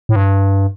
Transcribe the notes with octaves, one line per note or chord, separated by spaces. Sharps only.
A2
G2